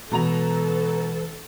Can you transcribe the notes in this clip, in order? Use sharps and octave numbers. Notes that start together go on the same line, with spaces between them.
B2 E3 G#3 A4 B4 A#5 F7